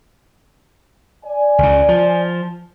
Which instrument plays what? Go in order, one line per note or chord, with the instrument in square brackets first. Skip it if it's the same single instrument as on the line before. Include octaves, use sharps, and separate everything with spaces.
[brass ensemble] D5 G#5
[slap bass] C#2 C#3
F3